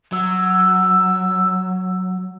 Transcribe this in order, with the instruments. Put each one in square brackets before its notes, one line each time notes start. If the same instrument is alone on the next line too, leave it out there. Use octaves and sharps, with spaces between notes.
[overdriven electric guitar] F#3 [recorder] E6